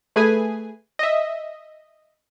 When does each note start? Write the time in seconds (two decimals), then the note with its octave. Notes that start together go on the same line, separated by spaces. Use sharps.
0.16 A3 G#4 B4 G#5
0.99 D#5 E5